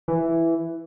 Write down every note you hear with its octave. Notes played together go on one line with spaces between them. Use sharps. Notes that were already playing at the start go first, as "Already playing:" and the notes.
E3